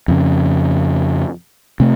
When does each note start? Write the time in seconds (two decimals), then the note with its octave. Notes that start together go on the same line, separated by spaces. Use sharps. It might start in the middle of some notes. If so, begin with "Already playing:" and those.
0.08 F2 C#3
1.80 C3 A3